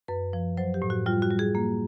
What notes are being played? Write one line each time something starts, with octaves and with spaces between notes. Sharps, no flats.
F#2 B4
F3
F#3 C5
G4
A2
F#4
G3 F4
F#4
G3
G#4
A#3